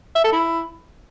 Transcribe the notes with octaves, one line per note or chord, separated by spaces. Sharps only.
E5
A4
E4